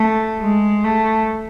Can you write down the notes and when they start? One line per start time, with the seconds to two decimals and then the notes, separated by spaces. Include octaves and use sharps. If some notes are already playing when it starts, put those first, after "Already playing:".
Already playing: A3
0.41 G#3
0.84 A3